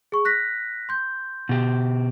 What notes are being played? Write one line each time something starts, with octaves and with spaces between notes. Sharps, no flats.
G#4 C#6
F#6 A#6 B6
C6 G6
B2 G4